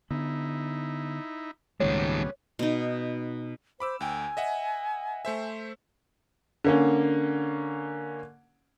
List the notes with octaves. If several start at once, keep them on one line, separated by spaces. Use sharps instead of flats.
D3 B3 D#4 E4
C#2 A#2 D#3 G3 G#3 B3 C#4 C#5
B2 D#4
C5 B5 D6 E6
D2 G5 G#5
D#5 E5 F#5
A3 C5 E5
D3 A#3 C#4